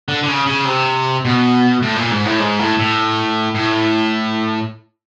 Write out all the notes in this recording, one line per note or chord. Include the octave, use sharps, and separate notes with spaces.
D3
D3
C#3
C#3
C3
B2
A2
A#2
G#2
A2
G#2
A2
A2
A2